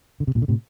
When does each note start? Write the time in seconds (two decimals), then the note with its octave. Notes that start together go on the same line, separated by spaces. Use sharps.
0.20 D3
0.27 C3
0.35 G2 A#2
0.42 D3
0.48 A2 C3